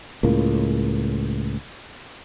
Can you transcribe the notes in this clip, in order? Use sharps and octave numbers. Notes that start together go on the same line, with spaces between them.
C#2 A2 A#3